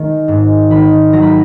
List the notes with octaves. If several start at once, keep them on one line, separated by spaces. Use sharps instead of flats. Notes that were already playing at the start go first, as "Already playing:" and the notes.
Already playing: D#3 G#3
G#2
D#3 B5
F#3 A#5
B5